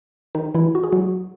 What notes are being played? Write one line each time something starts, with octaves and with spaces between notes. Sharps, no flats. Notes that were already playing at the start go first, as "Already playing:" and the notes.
D#3 D#4
E3 E4
F#4
G#4
F#3 F#4